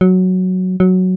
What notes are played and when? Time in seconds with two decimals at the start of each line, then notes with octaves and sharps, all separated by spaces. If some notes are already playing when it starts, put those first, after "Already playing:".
0.01 F#3
0.80 F#3